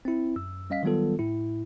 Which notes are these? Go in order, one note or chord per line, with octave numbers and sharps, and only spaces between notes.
C4 E4
F#2 E6
G3 C#4 D#5 F5 B6
D#3 F#3 G3 B3 F4 A4
A2 E4